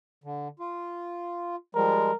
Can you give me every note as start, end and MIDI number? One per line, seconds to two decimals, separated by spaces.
0.24 0.48 50
0.60 1.56 65
1.75 2.11 53
1.75 2.11 55
1.75 2.11 56
1.75 2.16 70